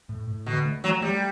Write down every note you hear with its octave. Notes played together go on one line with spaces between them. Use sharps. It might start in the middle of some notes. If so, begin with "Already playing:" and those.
A2
A2
B2 D3
A3
F#3 A3
G3 A3